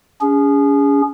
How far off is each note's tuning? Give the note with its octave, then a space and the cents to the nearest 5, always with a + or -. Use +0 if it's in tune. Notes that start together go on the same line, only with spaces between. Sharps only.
C#4 +35 G#4 -25